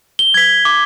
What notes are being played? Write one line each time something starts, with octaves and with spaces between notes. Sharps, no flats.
G7
G#6 B6
D6